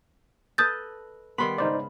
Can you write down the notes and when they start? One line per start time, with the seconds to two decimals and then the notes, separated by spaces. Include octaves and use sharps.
0.58 A4 B4 D#5 D#6 G6 A6
1.38 D#3 G3 B3 B5 C6
1.58 G#2 C#3 D#4 C5 D5